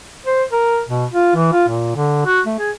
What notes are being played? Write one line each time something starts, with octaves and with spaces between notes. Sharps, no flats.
C5
A#4
B2
F4
E3
F4
A#2
D3
F#4
A3
G#4